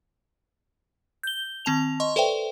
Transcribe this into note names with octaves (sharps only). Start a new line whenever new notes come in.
G6 G7
D#3 C4 A5 F7
D#5 C6 C#6
A4 B4 C5 D5 E5 G5